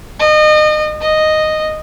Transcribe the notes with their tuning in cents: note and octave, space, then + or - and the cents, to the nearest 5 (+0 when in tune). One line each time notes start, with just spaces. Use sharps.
D#5 -30
D#5 -5